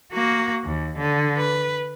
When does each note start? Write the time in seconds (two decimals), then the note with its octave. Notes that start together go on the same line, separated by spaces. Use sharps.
0.13 A#3 F#4
0.64 D#2
0.98 D3
1.37 B4